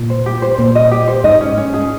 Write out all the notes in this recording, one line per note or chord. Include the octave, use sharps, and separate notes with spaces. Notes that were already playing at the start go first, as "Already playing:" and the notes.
Already playing: A#2
C5
G4
C5
A#2 C5
D#5
G4
C5
G#2 D#5
C#4
C#4
G#4